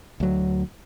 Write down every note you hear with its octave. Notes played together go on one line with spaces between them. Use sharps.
D2 F#3